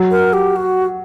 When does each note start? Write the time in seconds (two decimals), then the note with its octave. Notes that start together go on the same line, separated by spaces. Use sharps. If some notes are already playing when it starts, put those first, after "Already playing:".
Already playing: F#3
0.11 A#4
0.33 G4
0.56 F#4